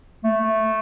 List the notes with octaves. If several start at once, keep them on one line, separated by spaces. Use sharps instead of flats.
A3